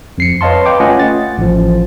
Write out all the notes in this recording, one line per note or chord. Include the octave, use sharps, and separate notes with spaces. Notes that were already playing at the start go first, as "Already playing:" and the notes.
F2 C7 C#7
B4 C#5 D#5 F5 A5 C6
B4 G5 D6
A3 C#4 F4 D#5 F#5 G#5
A6
A1 F3